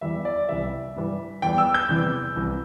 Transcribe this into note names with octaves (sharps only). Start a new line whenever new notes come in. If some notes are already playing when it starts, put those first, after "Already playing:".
E2 E3 G3 E5
D5
C2 C3 E3 G3 E5
G2 E3 G3
E2 E3 G3 G5
E6
G6
E2 C3 E3 G3
C2 C3 E3